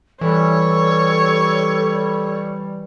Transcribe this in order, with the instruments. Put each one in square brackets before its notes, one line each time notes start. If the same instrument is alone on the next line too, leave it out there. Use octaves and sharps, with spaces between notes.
[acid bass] E3 [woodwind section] G3 [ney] A4 [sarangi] C#5